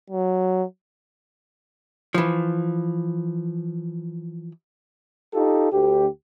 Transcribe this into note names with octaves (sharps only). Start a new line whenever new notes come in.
F#3
E3 F3
D#4 F4 G4 A4
D2 G4